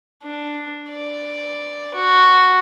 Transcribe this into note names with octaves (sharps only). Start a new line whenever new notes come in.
D4
D5
F#4